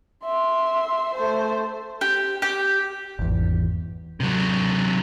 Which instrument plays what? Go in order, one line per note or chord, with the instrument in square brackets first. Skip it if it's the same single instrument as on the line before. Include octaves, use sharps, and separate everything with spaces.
[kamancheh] E5 C6
A3 C5
[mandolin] G4
G4
[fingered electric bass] G#1 E2
[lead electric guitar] C3 F#3